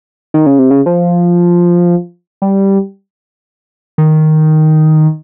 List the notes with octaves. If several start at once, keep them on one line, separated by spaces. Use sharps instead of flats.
D#3
C#3
C3
C#3
F3
G3
D#3